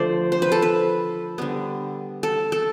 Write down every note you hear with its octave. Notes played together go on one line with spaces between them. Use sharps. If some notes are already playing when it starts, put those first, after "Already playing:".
Already playing: D3 F3 A3 C5 D5
C5
B4
A4
B4
D3 G3 B3
A4
A4